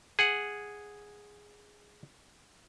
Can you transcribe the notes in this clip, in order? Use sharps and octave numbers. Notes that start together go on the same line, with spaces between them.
G#4 F#5